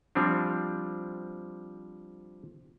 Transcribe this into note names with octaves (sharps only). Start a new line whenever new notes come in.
F3 G3 C4 D4